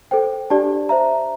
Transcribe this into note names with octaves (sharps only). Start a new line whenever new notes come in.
A4 C5 G5
D4 G4 D5 A5
C5 E5 A#5